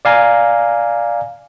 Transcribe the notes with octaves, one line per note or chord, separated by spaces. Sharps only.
D5 F5 G#5 A#5